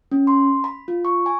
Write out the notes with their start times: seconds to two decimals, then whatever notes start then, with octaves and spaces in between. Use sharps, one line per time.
0.12 C#4
0.27 C6
0.64 B5
0.88 F4
1.05 C#6
1.26 G#5